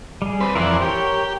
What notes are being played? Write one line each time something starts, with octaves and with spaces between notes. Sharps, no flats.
G3 G#4
C4 B4
F2 E3 C4 A#4 D5 F#5
G4 A#4 C#5